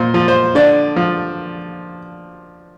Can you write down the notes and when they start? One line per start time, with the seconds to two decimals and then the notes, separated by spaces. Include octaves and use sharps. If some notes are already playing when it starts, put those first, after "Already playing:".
Already playing: A#2 C5
0.14 F3
0.28 C5
0.55 D3 D5
0.96 F3